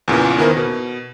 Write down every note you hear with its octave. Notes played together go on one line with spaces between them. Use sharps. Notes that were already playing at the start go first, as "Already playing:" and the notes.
E2 A#2 C#3 E3
D#3 B3 E4 A#4 C5
B2